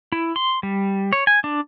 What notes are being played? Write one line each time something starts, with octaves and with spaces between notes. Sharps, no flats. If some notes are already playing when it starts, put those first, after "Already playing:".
E4
C6
G3
C#5
G#5
D4